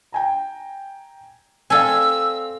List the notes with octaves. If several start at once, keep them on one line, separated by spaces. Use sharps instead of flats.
G5 G#5 A#5
C4 A4 D5 F5 G#5 E6